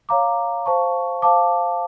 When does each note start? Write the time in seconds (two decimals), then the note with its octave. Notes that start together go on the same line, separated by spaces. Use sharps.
0.09 C#5 F5 A#5 D6
0.66 C5 F5 A5 C#6
1.22 C5 F5 A5 D6